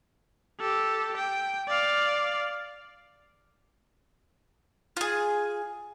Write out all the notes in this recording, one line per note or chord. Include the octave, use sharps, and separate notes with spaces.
G4 A4
G5
D5 F5
F4 G#4